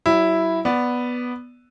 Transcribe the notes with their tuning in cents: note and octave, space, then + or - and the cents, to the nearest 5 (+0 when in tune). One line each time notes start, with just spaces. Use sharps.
F#3 +40 E4 +0
B3 +0 D5 +0